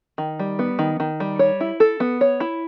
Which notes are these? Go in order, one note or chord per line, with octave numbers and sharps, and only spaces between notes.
D#3
G3
B3
D#3
D#3
G3
C#5
E4
A4
B3
C#5
E4